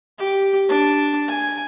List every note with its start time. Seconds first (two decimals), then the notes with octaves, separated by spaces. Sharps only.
0.19 G4
0.69 D4
1.28 G#5